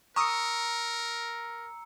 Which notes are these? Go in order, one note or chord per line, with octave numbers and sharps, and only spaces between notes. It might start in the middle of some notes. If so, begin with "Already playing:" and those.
A#4 A#5 C#6 D#6 E6 C#7